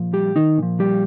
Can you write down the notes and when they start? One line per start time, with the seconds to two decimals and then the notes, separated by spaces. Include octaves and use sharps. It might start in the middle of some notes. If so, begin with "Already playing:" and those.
Already playing: A#2 F3
0.13 G3 G4
0.36 D#3 D#4
0.58 A#2 F3
0.80 G3 G4